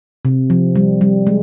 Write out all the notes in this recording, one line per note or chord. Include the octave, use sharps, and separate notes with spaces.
C3
F3
G3
G3
G#3